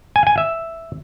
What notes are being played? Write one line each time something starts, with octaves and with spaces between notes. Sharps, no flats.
G#5
G#5
E5